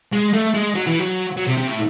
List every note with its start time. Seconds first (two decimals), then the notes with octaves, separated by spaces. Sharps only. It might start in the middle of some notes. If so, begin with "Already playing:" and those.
0.13 G#3
0.33 A3
0.54 G#3
0.75 F#3
0.87 E3
0.99 F#3
1.37 F#3
1.47 C3
1.58 C3
1.67 A2